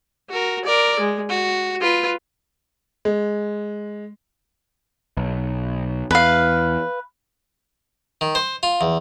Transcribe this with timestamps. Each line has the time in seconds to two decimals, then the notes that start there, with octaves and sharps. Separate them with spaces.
0.30 F#4 A#4
0.64 A#4 D5
1.00 G#3
1.29 F#4
1.81 F4 B4
3.05 G#3
5.17 B1
6.11 E2 B4 F5
8.21 D#3
8.35 C5
8.63 F4
8.81 E2